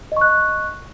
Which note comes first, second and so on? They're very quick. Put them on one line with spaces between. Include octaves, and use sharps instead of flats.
D#5 C#6 F#6